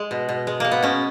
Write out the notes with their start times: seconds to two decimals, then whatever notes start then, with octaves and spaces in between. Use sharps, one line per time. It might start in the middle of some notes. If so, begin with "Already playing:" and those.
Already playing: G#3
0.11 B2
0.29 B2
0.47 G#3
0.60 G#3 A#3
0.71 B3
0.83 B2 C#4